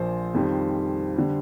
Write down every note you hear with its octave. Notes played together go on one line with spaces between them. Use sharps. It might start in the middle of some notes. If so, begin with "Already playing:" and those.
Already playing: A#1 A#2 F3 C5
F2 D#3 G3
D3 G3